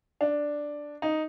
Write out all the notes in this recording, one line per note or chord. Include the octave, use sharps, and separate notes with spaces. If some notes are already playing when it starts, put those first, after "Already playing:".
D4
D#4